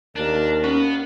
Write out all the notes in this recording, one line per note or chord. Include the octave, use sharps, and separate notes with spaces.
D#2 D4 A#4
B3 C#4